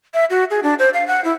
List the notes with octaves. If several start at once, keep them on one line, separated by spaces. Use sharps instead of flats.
E5
F#4
G#4
D4
C5
F5
F#5
E4